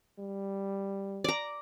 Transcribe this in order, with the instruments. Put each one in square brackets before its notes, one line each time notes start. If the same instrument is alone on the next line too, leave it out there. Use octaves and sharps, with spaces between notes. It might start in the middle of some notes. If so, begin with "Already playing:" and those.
[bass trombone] G3
[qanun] D5 A#5